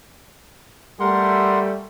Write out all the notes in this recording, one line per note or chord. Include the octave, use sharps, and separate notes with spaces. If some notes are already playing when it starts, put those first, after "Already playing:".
G3 A3 A#4 F#5 C6